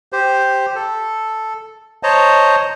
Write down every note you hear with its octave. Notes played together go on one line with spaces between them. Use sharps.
G4 C5
A4
C5 C#5 D#5 A5 A#5